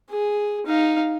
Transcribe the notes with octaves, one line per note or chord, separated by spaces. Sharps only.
G#4
D#4 F5